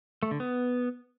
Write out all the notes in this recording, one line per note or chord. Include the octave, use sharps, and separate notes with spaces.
A3
D3
B3